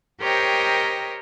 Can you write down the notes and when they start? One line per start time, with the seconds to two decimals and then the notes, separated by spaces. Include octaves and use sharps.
0.20 G4 A#4 C5 C#5 D#5 G5